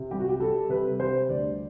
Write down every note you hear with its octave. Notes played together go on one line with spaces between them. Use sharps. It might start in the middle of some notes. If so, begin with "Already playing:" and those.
Already playing: C3
G3 G4
F#4
G4
G3 A4
C3 B4
G3 C5
D2 D5